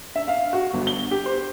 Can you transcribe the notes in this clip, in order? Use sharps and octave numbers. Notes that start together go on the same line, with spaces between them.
E5
F5
F#4
G1
G7
G4
C5